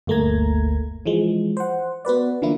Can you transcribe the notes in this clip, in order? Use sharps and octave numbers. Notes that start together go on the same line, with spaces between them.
G1 D2 A3 A#3 A#5 G#6
E3 F3 G#3
C5 F#5
B3 F#4 B4 D5
D3 E3 F3 A#3 E4